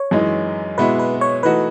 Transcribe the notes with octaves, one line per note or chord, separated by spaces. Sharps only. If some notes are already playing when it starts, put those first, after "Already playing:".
Already playing: C#5
F#2 E3 G#3 D#4
B2 G#3 B3 E4 B4
B4
C#5
E3 A3 D#4 F#4 B4